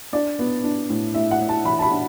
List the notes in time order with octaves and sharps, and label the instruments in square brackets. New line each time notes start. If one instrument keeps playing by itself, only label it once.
[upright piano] D4 D5
B3
D4
A2
A2 E5
F#5
A2
A5
E3 B5
A5
B5
D4